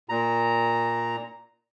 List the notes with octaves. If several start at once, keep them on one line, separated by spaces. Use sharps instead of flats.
A#2 A#5